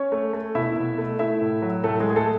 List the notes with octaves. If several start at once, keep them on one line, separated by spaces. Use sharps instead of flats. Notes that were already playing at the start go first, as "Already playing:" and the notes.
Already playing: C#4 C#5
A3
A3
B2 E4 E5
B2
A3
A3 E4 E5
A2
F#3
A2 A3 A4
G#3 G#4
A3
G#4
A3 A4